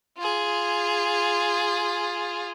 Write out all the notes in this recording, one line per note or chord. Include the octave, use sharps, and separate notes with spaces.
F4 G#4